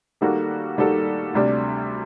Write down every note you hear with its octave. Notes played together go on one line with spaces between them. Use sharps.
D#3 G3 A#3 F#4 A4
D#3 G3 A#3 F#4 A4
D2 C3 G3 D4